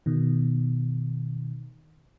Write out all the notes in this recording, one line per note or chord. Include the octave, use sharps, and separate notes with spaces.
B2 D#3